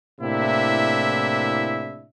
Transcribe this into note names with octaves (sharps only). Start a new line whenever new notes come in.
A2 C3 A#3 D4 E4 E5